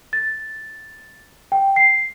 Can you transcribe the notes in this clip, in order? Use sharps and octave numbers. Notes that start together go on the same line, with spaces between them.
A6
G5
C7